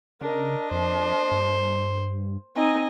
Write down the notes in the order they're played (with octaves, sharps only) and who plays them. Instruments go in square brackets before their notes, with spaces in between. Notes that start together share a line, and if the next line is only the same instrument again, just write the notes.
[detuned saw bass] C#3 [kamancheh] D4 D#5 [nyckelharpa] A#4
[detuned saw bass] F2 [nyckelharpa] C5
[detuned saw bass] G2
[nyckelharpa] C4 D#4 [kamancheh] D#5 G#5